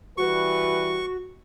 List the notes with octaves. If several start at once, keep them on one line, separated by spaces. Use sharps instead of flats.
E3 G3 F#4 B4 C#6